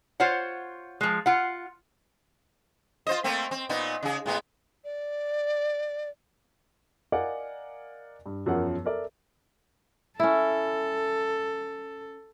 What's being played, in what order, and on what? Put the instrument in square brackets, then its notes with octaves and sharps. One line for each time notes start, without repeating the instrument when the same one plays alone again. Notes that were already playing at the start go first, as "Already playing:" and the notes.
[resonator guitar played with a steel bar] F4 C5 C#5 F#5
F3 G#3
F4 F#5
[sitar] F4 C5 D#5
A3 A#3 C4
C4
A#2 B3 D#4
C#3 G#4
A2 G#3 B3
[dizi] D5
[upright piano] A#4 D5 D#5 F5 F#5 G#5
G2
E1 F#2 F3 F#3 A#4 F#5
A4 A#4 D5 E5
[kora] C#4 E4 [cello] A4